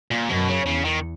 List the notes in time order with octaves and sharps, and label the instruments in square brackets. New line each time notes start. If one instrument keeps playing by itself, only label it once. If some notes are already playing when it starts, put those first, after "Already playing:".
[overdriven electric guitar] A#2
[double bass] F#2 [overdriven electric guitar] B2
[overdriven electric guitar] C#3
[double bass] E2 [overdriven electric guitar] C#3
[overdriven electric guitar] D#3